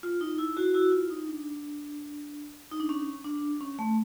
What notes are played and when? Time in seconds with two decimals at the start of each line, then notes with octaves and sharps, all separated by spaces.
0.03 F4
0.21 D#4
0.39 E4
0.57 E4 F#4
0.74 E4 F#4
0.92 F4
1.10 D#4
1.28 D4
2.71 D#4
2.80 D4
2.89 C#4
3.24 D4
3.61 C#4
3.79 A3